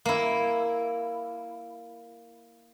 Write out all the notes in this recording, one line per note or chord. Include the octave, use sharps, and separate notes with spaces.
A#3 E4